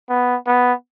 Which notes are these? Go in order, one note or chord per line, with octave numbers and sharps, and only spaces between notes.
B3
B3